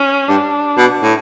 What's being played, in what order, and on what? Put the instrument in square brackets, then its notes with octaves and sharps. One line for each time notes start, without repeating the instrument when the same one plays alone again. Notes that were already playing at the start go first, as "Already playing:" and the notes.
Already playing: [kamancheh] C#4
[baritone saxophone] G2 [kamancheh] D4
[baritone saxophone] B2
A2